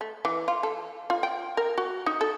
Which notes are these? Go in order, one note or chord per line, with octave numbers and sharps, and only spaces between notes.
A3
E3
F4
A4
F4
G5
A#4
F#4
D#4
A4